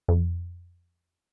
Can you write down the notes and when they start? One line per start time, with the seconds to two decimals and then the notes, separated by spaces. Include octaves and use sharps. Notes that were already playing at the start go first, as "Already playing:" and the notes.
0.08 F2